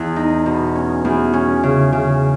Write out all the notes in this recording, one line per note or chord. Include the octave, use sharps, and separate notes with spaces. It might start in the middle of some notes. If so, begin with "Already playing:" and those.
Already playing: E2
D#4
B2
C#4
E2
C#4
C#3
C#3